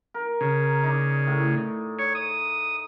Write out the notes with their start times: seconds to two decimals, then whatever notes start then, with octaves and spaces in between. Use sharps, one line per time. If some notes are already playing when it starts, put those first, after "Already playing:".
0.14 A#4
0.41 C#3
0.84 D#4 D5
1.27 A2
1.99 C#5
2.15 D#6